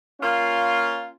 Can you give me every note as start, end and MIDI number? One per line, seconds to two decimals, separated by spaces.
0.21 1.09 58
0.21 1.09 61
0.21 1.09 65